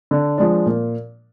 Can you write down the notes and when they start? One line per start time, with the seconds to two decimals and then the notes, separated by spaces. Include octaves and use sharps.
0.11 D3
0.38 F3 G#3 D4
0.66 A#2